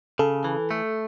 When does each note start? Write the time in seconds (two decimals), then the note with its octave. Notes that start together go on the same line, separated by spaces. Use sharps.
0.19 C#3 A4
0.44 E3
0.71 A3